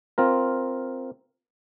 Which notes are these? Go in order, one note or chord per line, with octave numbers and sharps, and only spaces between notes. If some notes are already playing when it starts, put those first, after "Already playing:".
C4 F4 A#4